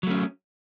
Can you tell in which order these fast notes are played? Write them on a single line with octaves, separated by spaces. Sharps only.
F#3 A3 C#4